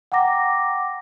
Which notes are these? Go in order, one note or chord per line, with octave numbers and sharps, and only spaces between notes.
F#5 G5 A#5 D6 A#6